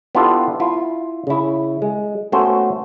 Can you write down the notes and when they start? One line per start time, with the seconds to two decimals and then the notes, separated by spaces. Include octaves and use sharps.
0.15 B3 D4 E4 F4 G4 A4
0.60 E4 F4
1.27 C#3 E4
1.82 G#3
2.32 A3 B3 C#4 F#4 C5